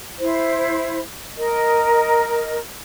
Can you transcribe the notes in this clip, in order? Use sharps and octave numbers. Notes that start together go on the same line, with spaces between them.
E4 C5
A#4 D#5